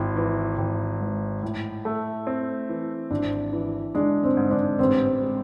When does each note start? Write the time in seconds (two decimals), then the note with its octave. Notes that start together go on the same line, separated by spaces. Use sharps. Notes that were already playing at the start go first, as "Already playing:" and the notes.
Already playing: G#1 E4
0.16 E3
0.58 G#1
1.01 G#2
1.42 A2
1.85 A3
2.27 C4
2.69 E3
3.11 G#1 D4
3.53 E3
3.95 G#3 D4
4.24 C4
4.37 G#2
4.51 D4
4.79 A1 C4
5.21 G#3